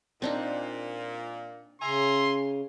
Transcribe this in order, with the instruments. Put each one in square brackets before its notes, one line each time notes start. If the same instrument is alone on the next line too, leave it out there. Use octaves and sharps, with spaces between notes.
[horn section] A#2 [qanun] C4 D4 D#4
[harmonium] C#3 [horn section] E5 G#5 A#5 [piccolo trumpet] C6